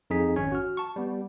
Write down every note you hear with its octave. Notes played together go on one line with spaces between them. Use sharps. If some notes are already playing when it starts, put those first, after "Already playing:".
F2 D#4 G#4 B6
G#1 C#4 C#5
F#4 F6
A5 C#6
G3 B3